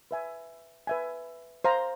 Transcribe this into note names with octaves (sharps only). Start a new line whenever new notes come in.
B4 E5 G#5
B4 E5 G#5
C5 F5 A#5